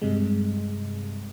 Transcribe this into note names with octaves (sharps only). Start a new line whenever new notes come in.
G2 C3 G#3